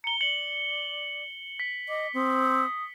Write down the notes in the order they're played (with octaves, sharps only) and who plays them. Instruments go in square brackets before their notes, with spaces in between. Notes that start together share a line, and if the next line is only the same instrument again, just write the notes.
[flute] A#5 [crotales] C#7 G7
[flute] D5 [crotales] C#7 F#7
[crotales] B6
[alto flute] D#5 [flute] D6
[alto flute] C4 [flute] D#6